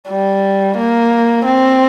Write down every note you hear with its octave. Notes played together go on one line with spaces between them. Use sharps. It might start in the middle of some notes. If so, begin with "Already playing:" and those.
G3
A#3
C4